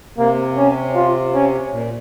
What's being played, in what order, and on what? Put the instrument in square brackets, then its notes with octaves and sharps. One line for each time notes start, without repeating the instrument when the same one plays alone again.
[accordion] C3 [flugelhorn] A#3
[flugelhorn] C#4
F4
C#4
[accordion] A#2